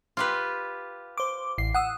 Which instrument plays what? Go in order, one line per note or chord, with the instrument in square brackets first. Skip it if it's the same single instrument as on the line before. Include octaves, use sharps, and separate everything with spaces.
[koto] F4 G4 B4
[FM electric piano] C5 D6
A1 C7
F#5 D#6 E6